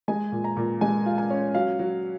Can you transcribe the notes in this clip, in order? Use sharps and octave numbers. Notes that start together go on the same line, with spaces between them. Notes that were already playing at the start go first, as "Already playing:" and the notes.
G#3 G#5
A#2
A#5
A#2
G#3 G#5
F4
G#5
C#4
F#3 F5
F#3